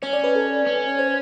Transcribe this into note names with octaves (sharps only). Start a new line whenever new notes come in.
C#4 C#5
D5
B4
A4
C#4
C#5
C5